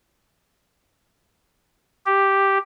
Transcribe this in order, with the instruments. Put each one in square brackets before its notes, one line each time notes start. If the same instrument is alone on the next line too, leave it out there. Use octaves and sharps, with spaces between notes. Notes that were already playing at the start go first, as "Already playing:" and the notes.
[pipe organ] G4